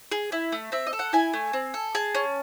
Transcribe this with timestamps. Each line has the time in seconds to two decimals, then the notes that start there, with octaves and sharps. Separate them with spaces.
0.12 G#4
0.32 E4
0.52 A3
0.72 C4 E5
0.87 D#5
0.93 A4
0.99 F#5
1.13 E4 G#5
1.33 A3
1.53 C4
1.74 A4
1.95 G#4 A5
2.15 C#4